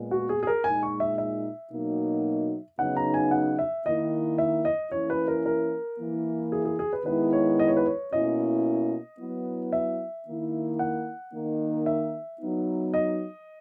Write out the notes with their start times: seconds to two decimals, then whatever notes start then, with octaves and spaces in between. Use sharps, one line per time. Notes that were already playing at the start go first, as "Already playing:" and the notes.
Already playing: A#2 G#3 B3
0.11 F#4
0.29 G#4
0.43 G#4
0.47 A#4
0.64 A#2 G#3 D#4 G#5
0.83 C#6
1.00 E5
1.18 E5
1.72 B2 F#3 A#3 D#4
2.78 C#3 F#3 B3 D#4 F#5
2.97 A#5
3.14 G#5
3.31 F#5
3.59 E5
3.86 D#3 A#3 E4 D#5
4.38 E5
4.65 D#5
4.92 E3 A#3 C#4 E4 C#5
5.10 B4
5.28 A#4
5.46 A#4
5.99 E3 A#3 E4
6.52 G#4
6.65 G#4
6.79 G#4
6.93 B4
7.06 D#3 G#3 B3 E4 B4
7.33 C#5
7.59 D#5
7.68 C#5
7.77 B4
7.86 C#5
8.13 B2 A#3 C#4 E4 D#5
9.20 F#3 B3 E4
9.73 E5
10.26 D#3 A#3 E4
10.79 F#5
11.33 D#3 A#3 D#4
11.86 E5
12.40 F#3 B3 D#4
12.94 D#5